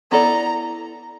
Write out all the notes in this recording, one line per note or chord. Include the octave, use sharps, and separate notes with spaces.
B3 E4 A4 D5 A#5